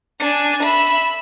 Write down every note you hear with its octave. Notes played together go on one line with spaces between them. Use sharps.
D4 G#5
E5 B5